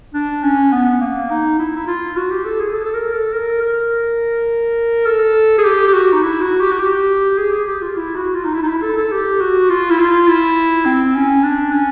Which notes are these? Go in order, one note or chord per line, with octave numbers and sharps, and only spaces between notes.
D4
C#4
B3
A#3
D#4
E4
E4
F4
F#4
G4
A4
G#4
A4
A4
A#4
A4
A#4
A#4
A4
G#4
G4
G4
F#4
D#4
E4
F#4
G4
F#4
G4
G#4
G#4
G4
F4
E4
F#4
F4
D#4
E4
D#4
E4
A4
A4
G4
F#4
F4
E4
F4
E4
C4
C#4
D4
C#4